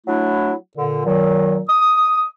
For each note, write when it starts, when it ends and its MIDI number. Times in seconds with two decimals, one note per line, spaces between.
0.07 0.53 54
0.07 0.53 57
0.07 0.53 62
0.07 0.53 64
0.77 1.05 46
0.77 1.05 50
1.06 1.60 46
1.06 1.60 51
1.06 1.60 54
1.69 2.26 87